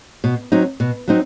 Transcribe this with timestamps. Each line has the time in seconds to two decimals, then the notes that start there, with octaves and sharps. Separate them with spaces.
0.24 B2
0.52 F#3 C4 D#4
0.80 B2
1.08 F#3 C4 D#4